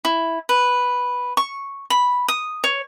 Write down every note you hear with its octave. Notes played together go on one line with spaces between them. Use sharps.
E4
B4
C#6
B5
D#6
C#5